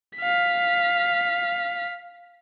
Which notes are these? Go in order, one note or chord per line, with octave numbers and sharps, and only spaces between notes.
F5 B6